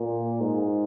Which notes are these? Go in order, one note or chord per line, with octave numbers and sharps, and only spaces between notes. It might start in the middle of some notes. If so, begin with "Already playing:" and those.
Already playing: A#2
G#2